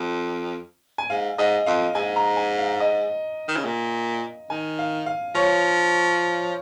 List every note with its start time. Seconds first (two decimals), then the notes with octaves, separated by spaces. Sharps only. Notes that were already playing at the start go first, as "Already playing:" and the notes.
Already playing: F2
0.98 G#5
1.10 G#2 F5
1.38 G#2 D#5
1.66 F2 F5
1.95 G#2 G#5
2.16 A#5
2.37 G#5
2.58 F5
2.80 D#5
3.48 D#3
3.57 C#3
3.65 A#2
4.50 D#3 G#5
4.79 F5
5.06 F5
5.35 F3 C#5